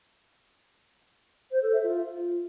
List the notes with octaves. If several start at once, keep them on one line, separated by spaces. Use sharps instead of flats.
C5
A4
E5
F4